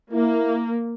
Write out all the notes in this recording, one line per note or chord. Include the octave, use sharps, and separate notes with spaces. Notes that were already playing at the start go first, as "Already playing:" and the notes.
A#3 E4